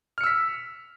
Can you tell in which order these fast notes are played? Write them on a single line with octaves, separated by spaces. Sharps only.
F6 C#7 E6 B6